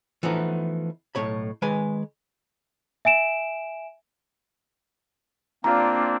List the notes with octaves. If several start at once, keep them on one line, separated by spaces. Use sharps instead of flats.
E3 F3 A3 B3 D#4
B1 F#2 A2 C#5 B5
D#3 G#3 B4 G#5
E5 G#5 D7 E7
A#3 C4 D4 F4 D5 A#5